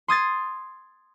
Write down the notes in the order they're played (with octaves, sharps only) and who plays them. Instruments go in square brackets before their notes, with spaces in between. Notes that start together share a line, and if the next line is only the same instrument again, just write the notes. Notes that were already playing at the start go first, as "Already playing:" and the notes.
[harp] C6 D#6 G#6 A6